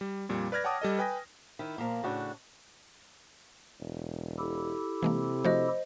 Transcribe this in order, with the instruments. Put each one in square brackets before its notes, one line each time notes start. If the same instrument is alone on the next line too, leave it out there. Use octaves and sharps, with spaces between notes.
[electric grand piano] G3
F2 A#2 G3
B4 D5 F6 G#6 A#6
C#5 F#5 G5 A5 D6 D#6
G3 A4 D#5
B4 G5 G#5 D#6 A#6
[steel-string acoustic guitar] D#3 E4
A#2 F3 A#3
A2 C#3 D4 F#4
[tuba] E1
[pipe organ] E4 G4 A4
[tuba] C3 [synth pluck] E3 G#3 A#3
[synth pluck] F3 A3 F#4 [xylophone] C5 D#5